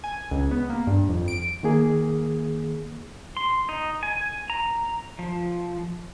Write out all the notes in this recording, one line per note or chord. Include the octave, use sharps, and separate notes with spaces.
G#5
C#2
B3
A#3
G2
F2
D7
D#3 A#3 G#4
C6
D#4
G#5
A#5
F3